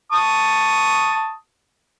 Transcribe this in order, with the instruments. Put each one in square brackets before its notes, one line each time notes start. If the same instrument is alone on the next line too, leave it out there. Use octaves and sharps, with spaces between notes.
[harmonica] A5 C#6 D#6